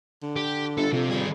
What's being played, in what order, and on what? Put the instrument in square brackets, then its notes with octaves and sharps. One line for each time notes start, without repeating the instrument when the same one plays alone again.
[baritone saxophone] D3
[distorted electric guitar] G4
[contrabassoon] G1 [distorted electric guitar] A4
[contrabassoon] F2 [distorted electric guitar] C3
[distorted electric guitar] D#3 G#4 [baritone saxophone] G3